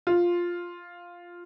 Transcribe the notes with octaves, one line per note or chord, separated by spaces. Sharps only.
F4